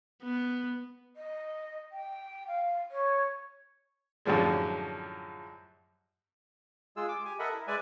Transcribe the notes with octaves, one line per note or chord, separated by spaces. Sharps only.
B3
D#5
G5
F5
C#5
F#2 A2 D3 F3 G3 G#3
G#3 F4 G#4 E6
D6
G4 G#5
A4 A#4 D#5 E5 F#5 B5
E4
G#3 B4 D5 E5 G#5